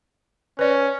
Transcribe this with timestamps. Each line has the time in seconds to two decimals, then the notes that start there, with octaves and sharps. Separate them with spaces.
0.59 C#4 B4 D5